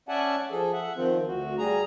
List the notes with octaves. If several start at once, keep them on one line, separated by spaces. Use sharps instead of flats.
C#4 D5 E5 F#5 G#5 A5
F3 G#4 A4
E5 F#5
D#3 F3 C4 F4
D2 F#4
G3 G#4 A#5